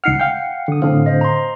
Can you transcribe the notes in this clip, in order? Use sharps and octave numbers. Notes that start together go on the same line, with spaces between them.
C#2 D#4 F#5 F6 C7 C#7
F5 G5
D3 D#6
A2 D3 C4 F5
C5 D#5
A#5 C6